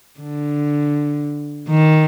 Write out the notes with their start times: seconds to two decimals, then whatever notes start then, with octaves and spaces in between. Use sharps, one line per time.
0.20 D3
1.69 D#3